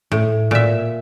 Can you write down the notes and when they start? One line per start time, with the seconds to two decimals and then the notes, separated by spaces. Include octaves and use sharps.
0.12 A2
0.51 A#2 E5